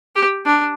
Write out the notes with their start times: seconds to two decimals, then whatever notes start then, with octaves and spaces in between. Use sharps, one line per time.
0.15 G4
0.45 D4